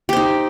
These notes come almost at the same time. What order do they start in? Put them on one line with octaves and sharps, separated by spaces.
G4 C5 D#4